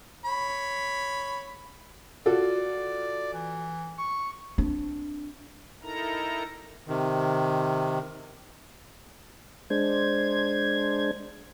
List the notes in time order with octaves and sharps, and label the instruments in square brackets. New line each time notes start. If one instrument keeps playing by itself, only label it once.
[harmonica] C#5 B5
[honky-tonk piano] F4 F#4 A4 [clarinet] D5
[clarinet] E3
C#6
[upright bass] C4 D4
[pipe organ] D#4 E4 A4 A#4 A#5
[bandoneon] C3 D#3
[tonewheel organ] G#3 D4 C5 G#6